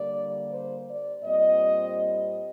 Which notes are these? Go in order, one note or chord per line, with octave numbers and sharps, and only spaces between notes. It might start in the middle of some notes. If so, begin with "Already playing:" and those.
Already playing: D3 G3 A#3 D5
C5
D5
A#2 G3 C4 D#5